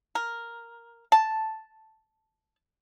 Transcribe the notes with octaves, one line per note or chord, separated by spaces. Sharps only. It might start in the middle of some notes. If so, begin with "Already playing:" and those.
A#4
A5